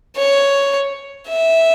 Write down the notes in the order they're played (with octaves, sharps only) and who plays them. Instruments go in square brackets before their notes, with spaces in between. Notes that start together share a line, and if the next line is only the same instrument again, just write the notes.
[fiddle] C#5
E5